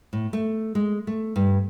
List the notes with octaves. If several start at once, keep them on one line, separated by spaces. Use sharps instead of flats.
A2
A3
G#3
A3
G2